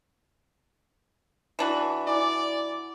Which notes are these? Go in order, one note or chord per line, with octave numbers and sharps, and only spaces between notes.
E3 D4 F#4
E4 D5 G#5 D6